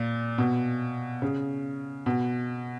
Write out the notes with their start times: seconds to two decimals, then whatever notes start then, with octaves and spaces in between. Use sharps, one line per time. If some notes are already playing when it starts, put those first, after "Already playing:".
Already playing: A#2
0.38 B2
1.22 C#3
2.06 B2